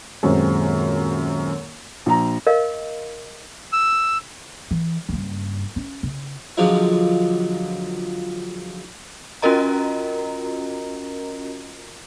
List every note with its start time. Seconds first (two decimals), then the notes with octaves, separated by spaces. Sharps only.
0.23 D#1 F#2 G#3 C4
2.06 A#1 A#5
2.47 A#4 D#5 F5
3.73 E6
4.71 E3
5.09 F#1 G2
5.76 C#4
6.03 C#3
6.57 D3 F3 F#3 G#3
9.42 C#4 F4 F#4 A#4 D#5 A#5